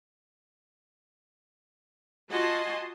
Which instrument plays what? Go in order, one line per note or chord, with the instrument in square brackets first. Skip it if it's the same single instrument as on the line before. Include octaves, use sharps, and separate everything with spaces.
[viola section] F4 F#4 D#5 G#5 A5 C6